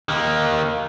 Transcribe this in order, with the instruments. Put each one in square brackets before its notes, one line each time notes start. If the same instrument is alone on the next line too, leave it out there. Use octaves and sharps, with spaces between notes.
[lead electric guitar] D#3 A#3